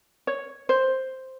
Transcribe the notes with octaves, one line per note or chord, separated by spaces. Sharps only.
C#5
C5